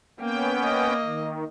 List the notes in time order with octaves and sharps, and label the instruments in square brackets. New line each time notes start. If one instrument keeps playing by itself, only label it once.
[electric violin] A#3 [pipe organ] B3 C#4 G5
[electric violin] A#3 D#5
[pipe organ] D#3